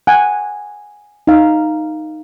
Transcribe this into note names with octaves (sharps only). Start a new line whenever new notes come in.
F#5 G#5
D#4 F5